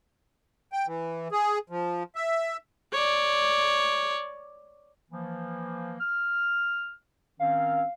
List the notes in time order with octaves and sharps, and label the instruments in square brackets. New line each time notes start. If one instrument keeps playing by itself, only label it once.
[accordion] G5
E3
G#4
F3
E5
[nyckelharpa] C#5 D5
[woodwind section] E3 F3 A#3
F6
[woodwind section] D#3 C4 C#4 [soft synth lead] F5